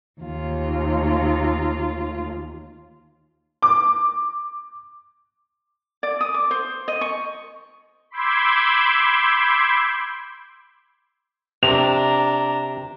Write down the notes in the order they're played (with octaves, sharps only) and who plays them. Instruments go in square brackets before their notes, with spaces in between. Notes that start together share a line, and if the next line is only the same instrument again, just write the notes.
[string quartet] D#2 F4
[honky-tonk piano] D6
[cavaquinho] D5
D#6
D6
C5
D#5
C#6
[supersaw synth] B5 C6 D6 E6 G6 G#6
[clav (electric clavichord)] C3 [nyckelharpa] D4 A#5 [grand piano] F7